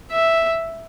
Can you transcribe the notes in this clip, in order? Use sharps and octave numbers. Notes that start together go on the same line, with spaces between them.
E5